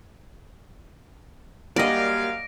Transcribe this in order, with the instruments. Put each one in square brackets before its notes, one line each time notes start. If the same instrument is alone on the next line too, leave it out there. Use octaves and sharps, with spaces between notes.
[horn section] F#2 F5 [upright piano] G3 A#3 [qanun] D5 D#5 [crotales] A#6 D7